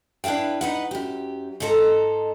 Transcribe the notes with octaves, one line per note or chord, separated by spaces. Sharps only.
D4 E4 B4 F5 G5
D#4 B4 F#5
F#2 G4
G#2 D#4 A4 C5 A#5